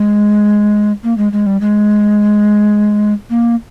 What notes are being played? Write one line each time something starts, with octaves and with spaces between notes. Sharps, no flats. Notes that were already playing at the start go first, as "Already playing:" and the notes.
Already playing: G#3
A#3
G#3
G#3
G3
G#3
A#3